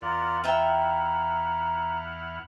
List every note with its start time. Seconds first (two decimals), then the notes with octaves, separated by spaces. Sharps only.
0.02 E2 F4 A#4 D5 F#5 F6
0.44 E4 F4 E5 G5 A#5